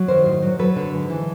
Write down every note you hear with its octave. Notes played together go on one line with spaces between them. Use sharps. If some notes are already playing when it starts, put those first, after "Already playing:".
Already playing: F#3
D#3 A#4 C5
A2
F#3
F#3 A4 B4
D3
G#2
E3